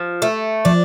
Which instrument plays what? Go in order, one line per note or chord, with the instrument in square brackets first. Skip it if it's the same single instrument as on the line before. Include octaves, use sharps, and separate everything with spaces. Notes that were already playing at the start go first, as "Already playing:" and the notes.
Already playing: [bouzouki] F3
A3
[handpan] F3 [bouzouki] D4